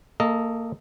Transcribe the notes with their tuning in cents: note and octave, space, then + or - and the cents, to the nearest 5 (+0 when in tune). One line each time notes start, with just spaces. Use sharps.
A#3 -25 A4 +0 D#5 +0